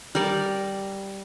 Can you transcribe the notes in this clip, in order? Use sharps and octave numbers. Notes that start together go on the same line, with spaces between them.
G3 A#4 D5